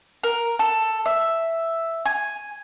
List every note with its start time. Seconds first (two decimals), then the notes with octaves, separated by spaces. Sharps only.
0.24 A#4
0.59 A4
1.06 E5
2.06 G#5